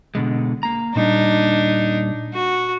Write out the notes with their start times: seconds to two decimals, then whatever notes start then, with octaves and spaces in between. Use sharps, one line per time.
0.15 B2 D3 G#3
0.63 A#3 A#5
0.96 A#2 G3 D4 D#4
2.34 F#4